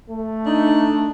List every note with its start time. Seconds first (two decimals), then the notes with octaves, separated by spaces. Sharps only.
0.10 A3
0.45 D4 D#4